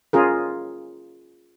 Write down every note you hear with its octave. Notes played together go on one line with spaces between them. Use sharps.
C#4 F4 G#4 A#4